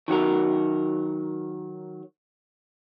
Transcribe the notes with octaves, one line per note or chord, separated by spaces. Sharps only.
D#3 F#3 F#4 A#4